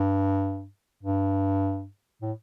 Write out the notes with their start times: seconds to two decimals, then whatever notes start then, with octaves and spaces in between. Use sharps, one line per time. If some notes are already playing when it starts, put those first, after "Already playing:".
Already playing: G2
1.03 G2
2.22 A2